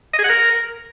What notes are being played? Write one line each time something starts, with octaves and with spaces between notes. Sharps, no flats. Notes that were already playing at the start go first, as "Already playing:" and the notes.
D#5
G#4
F#5
A#4